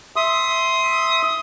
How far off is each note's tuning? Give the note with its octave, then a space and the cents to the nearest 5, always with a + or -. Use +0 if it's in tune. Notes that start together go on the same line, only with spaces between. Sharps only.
E5 +0 C6 +0 D#6 +20